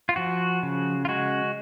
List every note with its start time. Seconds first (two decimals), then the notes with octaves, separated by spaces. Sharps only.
0.09 F4
0.16 F3 F#4
0.63 C#3
1.05 F4
1.08 G#3 F#4